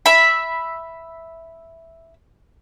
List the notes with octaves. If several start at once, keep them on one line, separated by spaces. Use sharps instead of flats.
E5 B5